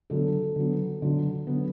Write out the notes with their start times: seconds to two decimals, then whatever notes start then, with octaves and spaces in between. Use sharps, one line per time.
0.10 D3 F#3 B3 A4
0.56 D3 F#3 B3
1.02 D3 F#3 B3
1.47 D3 F#3 B3